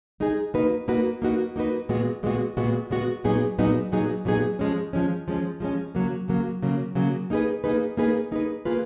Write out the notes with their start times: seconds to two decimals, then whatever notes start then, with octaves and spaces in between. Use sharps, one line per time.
0.20 G#3 D#4 G#4
0.54 A#3 D#4 F#4 B4
0.88 A#3 D#4 F#4 B4
1.22 A#3 D#4 F#4 B4
1.56 A#3 D#4 F#4 B4
1.89 A#2 G#3 B3 F#4
2.23 A#2 G#3 B3 F#4
2.57 A#2 G#3 B3 F#4
2.90 A#2 G#3 B3 F#4
3.24 A#2 F#3 B3 D#4 G#4
3.59 A#2 F#3 B3 D#4 G#4
3.92 A#2 F#3 B3 D#4 G#4
4.25 A#2 F#3 B3 D#4 G#4
4.59 F3 G#3 C#4
4.93 F3 G#3 C#4
5.28 F3 G#3 C#4
5.60 F3 G#3 C#4
5.95 C#3 F#3 A#3
6.28 C#3 F#3 A#3
6.62 C#3 F#3 A#3
6.95 C#3 F#3 A#3
7.30 A#3 D#4 G#4 B4
7.64 A#3 D#4 G#4 B4
7.97 A#3 D#4 G#4 B4
8.31 A#3 D#4 G#4 B4
8.65 A#3 F4 G#4 B4